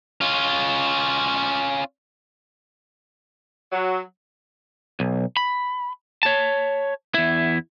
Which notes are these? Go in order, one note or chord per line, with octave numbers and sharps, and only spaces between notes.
C#4 F4
F#3
B1
B5
C#5 A5
E2 E4